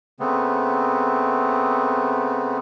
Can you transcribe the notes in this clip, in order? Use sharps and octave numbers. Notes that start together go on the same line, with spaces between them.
C#3 A3 B3 C4